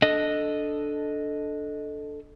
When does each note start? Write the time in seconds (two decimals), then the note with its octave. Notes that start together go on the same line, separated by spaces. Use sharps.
0.02 D4 A4 D#5